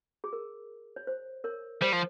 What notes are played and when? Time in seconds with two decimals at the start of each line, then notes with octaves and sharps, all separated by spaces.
0.24 G#4
0.33 A#4
0.96 C#5
1.07 C5
1.44 A#4 C#5
1.81 G3 C5
1.92 F3